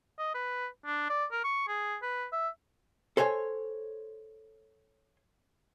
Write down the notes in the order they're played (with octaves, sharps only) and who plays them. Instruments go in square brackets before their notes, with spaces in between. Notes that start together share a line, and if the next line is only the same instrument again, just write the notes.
[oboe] D#5
B4
D4
D5
A#4
C#6
G#4
B4
E5
[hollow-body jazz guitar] A4 C5 C#5 F#5 G#5